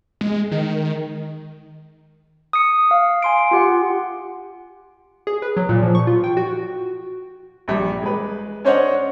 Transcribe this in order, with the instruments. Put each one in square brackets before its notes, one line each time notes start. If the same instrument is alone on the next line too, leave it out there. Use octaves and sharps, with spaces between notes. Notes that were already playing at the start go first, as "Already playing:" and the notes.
[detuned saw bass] G#3
D#3
[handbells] D#6 C#7
F5
G#5 C6 D7
F4 G4 F#5
[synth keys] G#4
B4
F#3
A#2
F3
C#6
F4
G5
F#4
[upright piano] A#1 G3
G#3 B4
C#4 D4 C5 C#5 D#5 F#5